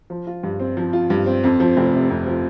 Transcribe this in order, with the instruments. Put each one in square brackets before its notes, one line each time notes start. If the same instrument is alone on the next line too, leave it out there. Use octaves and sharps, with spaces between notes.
[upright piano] F3
F4
G2
C4
F3
F4
G2
C4
F2
F3
F1
C3
F2
F3